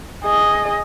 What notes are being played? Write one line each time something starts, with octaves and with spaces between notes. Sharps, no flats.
G#4 D#5